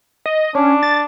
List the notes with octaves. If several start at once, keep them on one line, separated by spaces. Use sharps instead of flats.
D#5
C#4 D4
A6